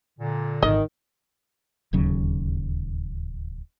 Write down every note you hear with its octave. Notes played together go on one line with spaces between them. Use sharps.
A#2 D3
G#1 D#3 D#5
D1 D#2 C#3 F#3